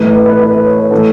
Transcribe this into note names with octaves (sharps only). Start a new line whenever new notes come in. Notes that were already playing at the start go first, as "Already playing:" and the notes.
Already playing: A2 E3 A3 B4
B4
B4
B4
B4
C#5
B4
E3 A3 A4